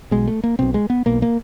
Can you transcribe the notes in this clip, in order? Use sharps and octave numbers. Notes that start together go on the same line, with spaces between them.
B1 B2 G#3
A3
A#3
B1 B2 C4
G#3
B3
B1 B2 A#3
A#3